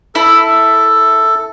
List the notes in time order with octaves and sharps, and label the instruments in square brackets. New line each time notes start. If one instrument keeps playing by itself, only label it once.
[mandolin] E4 [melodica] A4